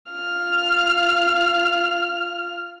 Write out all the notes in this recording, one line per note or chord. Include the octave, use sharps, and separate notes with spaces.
F4 F6